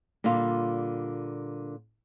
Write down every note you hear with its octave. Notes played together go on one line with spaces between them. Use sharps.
A#2 D3 G3 F4